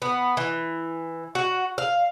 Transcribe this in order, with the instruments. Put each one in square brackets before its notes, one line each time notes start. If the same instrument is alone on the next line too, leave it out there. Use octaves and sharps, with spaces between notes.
[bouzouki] B3
E3
F#4
F5